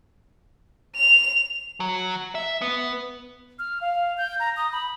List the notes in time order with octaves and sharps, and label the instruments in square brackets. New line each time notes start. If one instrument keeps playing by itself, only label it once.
[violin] F7
[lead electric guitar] F#3
E5
B3
[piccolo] F6
F5
G6
A#5
D#6
B5